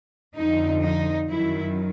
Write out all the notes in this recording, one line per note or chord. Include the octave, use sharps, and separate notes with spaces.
F2 D3 F3 D#4
D#4
F#2 D#3 F#3 E4